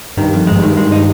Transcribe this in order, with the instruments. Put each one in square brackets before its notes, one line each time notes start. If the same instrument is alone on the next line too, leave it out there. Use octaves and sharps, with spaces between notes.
[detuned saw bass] G2 [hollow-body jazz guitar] D#3
[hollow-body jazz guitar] F2
[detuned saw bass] G2 [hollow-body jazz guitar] G#3
[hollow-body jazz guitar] D#3
G#3
D#4